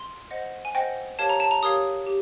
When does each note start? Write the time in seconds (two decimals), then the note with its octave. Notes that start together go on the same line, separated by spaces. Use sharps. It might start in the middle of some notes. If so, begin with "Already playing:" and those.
Already playing: C6
0.31 C5 D#5 F#5
0.65 G#5
0.75 C5 D#5 F#5 G5
1.19 G4 A#4 C#5 F5 A5
1.29 A#5
1.40 A5
1.51 A#5
1.63 G4 A#4 C#5 F5 D#6
2.07 G4